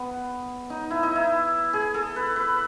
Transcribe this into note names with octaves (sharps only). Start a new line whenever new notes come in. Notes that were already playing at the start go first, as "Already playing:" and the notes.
Already playing: B3
D#4
E4
D#4
E4
G#4
A4
B4
B4